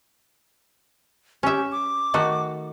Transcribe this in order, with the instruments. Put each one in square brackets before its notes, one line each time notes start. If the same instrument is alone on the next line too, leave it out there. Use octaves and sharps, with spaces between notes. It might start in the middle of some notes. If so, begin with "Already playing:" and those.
[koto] C#4 E5 [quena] G4
[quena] D6
[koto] D#3 A3 F#4